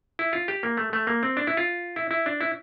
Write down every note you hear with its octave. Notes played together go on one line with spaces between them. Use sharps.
E4
F4
G4
A#3
A3
A3
A#3
C4
D4
E4
F4
E4
E4
D4
E4